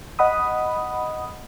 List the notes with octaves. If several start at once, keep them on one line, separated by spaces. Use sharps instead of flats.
D#5 F#5 B5 D#6